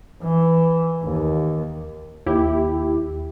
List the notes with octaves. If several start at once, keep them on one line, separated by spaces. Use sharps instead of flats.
E3
D#2
D#2 E4 G4